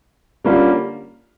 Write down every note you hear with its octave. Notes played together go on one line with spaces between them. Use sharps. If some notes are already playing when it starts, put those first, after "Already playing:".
D3 G3 A#3 C#4 F4